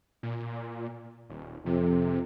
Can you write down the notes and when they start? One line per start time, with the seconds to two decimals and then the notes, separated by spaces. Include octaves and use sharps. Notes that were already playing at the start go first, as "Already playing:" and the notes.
0.23 A#2
1.30 D#1
1.66 F2 C3